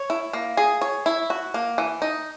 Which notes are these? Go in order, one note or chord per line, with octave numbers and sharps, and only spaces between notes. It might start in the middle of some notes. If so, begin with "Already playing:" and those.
Already playing: C#5
E4
A#3
G#4
C#5
E4
F#4
A#3
E3
D#4